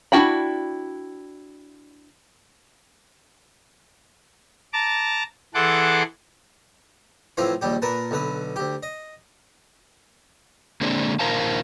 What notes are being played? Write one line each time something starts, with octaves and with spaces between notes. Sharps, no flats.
D4 E4 F#4 G5 B5
A5 A#5 D6
E3 G#4 A4 F#5 C6 D6
A2 E3 F3 C4 F4 F5
A#1 D#2 G3 G4
A#2 A#4 B4 A5
B1 D3 B4
D2 G4
D#5
D3 G#3 A#3 C4 D4
A#2 D#3 A#4 C5 F5 A5